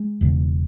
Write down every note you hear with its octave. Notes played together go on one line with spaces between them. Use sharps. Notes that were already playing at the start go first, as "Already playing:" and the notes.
Already playing: G#3
E1 E2 C#3